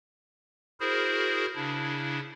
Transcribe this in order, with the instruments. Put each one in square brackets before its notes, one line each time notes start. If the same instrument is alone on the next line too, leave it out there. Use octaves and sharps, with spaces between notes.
[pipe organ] E4 F#4 G#4 A#4 C5
C#3 D4 E4